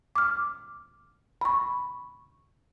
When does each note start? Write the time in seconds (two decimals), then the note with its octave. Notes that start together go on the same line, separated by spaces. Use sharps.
0.16 D6 F6
1.41 B5 C#6